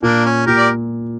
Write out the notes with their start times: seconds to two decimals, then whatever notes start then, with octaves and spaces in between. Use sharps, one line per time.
0.02 A#2 A#3 D4
0.26 C#4
0.46 A#2 G4 A#4
0.58 D5